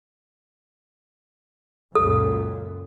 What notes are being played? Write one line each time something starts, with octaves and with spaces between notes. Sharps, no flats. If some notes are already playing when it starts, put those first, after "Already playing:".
C#2 F#2 A#2 A4